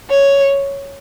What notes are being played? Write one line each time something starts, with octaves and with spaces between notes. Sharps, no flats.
C#5